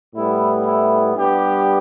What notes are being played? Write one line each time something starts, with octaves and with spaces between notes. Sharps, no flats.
A2 G3 B3 E4
E4
G2 G3 B3 G4